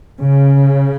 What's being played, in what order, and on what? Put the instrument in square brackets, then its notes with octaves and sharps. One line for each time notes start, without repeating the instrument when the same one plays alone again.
[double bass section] C#3